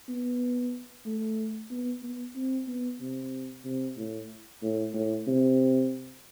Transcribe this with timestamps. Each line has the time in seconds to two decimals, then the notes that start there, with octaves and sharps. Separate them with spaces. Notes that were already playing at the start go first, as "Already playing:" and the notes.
0.08 B3
1.06 A3
1.70 B3
2.03 B3
2.35 C4
2.67 B3
3.00 C3
3.65 C3
3.97 A2
4.62 A2
4.94 A2
5.27 C3